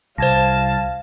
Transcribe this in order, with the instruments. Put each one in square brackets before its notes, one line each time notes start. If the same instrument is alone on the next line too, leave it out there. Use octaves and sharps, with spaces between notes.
[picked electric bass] C2 [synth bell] C5 G#6 A#6 [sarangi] F5 [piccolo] A5